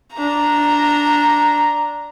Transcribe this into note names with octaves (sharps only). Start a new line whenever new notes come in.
D4 A#5